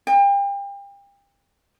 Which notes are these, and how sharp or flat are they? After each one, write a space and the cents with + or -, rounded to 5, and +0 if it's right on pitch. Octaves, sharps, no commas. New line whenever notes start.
G5 +35